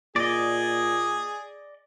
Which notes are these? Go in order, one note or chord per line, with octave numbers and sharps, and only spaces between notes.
A#2 G#4 D5 D#5